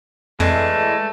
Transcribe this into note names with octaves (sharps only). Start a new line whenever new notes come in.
F2 E3 G#3 A3 D4